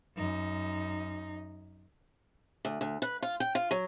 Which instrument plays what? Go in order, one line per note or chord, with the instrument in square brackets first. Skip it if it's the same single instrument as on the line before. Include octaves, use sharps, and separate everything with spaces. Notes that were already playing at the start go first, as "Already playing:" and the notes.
[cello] F#2 D#4
[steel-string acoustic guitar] D2
D2
B4
F4
G5
F4
F#3